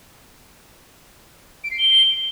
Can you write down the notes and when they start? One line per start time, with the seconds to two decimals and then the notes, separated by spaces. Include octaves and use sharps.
1.64 D7
1.71 C7
1.78 G7